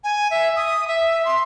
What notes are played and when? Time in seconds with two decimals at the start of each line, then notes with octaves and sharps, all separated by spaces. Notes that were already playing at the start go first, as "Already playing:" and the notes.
0.04 G#5
0.31 E5
0.56 D#6
0.88 E5
1.25 C6